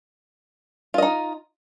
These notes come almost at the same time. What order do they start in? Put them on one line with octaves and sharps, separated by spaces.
F4 D#5 D#4